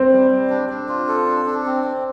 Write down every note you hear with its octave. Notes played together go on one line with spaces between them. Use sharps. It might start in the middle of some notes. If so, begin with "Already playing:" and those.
Already playing: C4
G3
G3
D4
D4
F4
A4
D4
D4
C4
C4